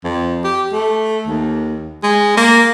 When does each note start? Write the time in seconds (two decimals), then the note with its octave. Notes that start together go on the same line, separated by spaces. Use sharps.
0.04 F2
0.44 G4
0.72 A3
1.27 D#2
2.03 G#3
2.37 A#3